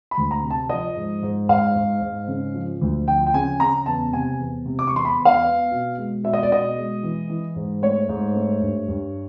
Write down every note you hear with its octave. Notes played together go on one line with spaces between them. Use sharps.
B5
D2
A#5
C3
A5
F3 D#5
G#2
G#2
G#2 F5
G#2
G#2
C#3
F3
D2
F3 G5
G5
C#3 G#5
C#3 A#5
E2 A5
C3 G#5
E2
C3
D6
C#6
E2 C6
B5
E2
F5
B3
B2
G#3
B2 E5
D#5
D5
B2 D#5
G#3
E3
E3
G#2
A3 C#5
G#2
A3
G2
G2